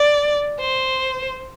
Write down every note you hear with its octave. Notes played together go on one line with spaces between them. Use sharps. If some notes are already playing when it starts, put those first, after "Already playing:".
Already playing: D5
C5